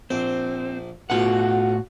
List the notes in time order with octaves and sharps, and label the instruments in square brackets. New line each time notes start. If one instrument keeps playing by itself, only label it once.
[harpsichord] A#1 C5 [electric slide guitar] C4
[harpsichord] B1 F4 [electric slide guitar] A2 C#4 F#5 [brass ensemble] F#4